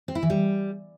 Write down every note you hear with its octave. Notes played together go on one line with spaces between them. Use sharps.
C4
E4
E3
G3